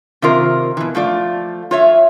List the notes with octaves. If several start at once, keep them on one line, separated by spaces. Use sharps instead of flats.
C3 D#3 F4 A#4
B2 E3
F3 A3 F4 D5
F4 C#5 E5